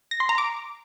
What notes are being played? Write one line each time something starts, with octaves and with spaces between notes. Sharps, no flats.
A#6
C6
A#5
D6